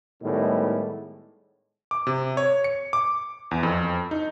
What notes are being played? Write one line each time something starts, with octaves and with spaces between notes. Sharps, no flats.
A2 D#3 G3 G#3 B3
D6
C3
C#5
C#7
D6
E2
F2
D#4